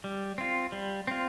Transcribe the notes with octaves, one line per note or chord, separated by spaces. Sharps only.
G3
C4 F4
G3
C4 F4